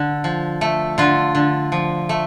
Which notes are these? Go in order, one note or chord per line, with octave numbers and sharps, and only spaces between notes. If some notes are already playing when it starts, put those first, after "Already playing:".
Already playing: D3
F3
A3
D3 F4
D3
F3
A3